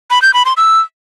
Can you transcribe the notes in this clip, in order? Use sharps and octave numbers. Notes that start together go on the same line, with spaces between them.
B5
G6
B5
C6
E6